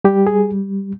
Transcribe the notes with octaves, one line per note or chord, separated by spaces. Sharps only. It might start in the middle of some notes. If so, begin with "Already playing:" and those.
G3 G4
G#4